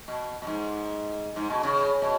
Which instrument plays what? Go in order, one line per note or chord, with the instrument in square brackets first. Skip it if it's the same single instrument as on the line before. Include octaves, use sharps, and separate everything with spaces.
[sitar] B2
B2
G#2
G#2
B2
C#3
B2